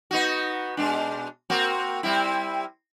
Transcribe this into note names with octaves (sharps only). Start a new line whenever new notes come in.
B3 D#4 F#4
B2 G#3 D4
A#3 C4 F#4
G3 C4 E4